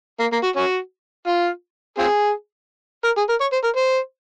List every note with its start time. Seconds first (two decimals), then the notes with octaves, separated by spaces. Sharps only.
0.20 A#3
0.33 A#3
0.43 F#4
0.56 C#4 F#4
1.27 F4
1.98 C4 F4 G#4
3.04 A#4
3.17 G#4
3.29 A#4
3.41 C#5
3.52 C5
3.64 A#4
3.76 C5